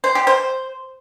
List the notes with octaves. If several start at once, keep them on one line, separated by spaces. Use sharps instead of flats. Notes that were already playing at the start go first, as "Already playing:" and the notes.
C5
G4
C5